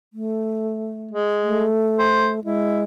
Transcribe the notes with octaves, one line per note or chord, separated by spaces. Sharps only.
A3
G#3
A3
C5
G#3 E4